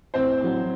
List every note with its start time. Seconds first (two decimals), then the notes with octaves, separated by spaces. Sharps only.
0.14 A1 C4 C5
0.40 A2 F#3